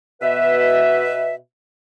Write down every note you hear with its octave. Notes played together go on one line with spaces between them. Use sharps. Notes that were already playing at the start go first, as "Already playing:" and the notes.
B2 B4 E5